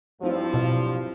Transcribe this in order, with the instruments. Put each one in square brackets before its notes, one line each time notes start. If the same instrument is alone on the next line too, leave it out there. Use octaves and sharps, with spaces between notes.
[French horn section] G2 F3 [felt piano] F#3 C4 E4
[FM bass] B2